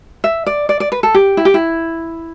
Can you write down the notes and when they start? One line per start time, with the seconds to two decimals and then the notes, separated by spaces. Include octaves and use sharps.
0.24 E5
0.46 D5
0.69 D5
0.80 D5
0.92 B4
1.03 A4
1.15 G4
1.37 E4
1.45 G4
1.54 E4